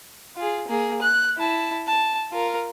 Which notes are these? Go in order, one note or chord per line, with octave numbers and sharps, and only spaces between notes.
F4 G#4
A#3 G#4
F#6
E4 A5
A5
F4 A#4